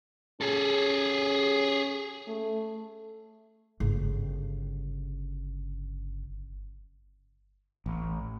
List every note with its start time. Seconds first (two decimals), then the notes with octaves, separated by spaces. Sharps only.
0.41 C#4 G#4 A4
2.28 A3
3.80 G1 C#3
7.86 A1